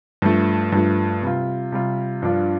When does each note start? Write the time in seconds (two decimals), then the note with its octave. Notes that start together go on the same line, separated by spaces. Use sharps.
0.22 G2 F3 A3
0.72 G2 F3 A3
1.22 C3 G3 F4
1.72 C3 G3 F4
2.22 G2 F3 D4 F4